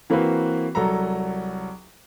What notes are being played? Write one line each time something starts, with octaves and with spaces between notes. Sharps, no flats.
E3 A#3 C4 F#4 B4
C2 F#3 A4 A#5